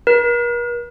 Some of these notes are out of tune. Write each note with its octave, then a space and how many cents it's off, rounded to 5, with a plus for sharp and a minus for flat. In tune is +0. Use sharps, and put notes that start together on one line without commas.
A#4 +45